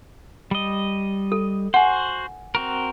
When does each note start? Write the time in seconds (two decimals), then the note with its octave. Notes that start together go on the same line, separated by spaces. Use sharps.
0.51 G3 D#5
1.32 A4
1.74 F#4 C5 F#5 G#5
2.55 C4 F#4 A#4